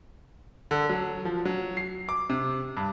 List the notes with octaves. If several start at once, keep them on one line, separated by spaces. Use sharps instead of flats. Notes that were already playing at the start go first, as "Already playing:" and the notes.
D3
F#3
F3
F#3
C7
D6
C3
G2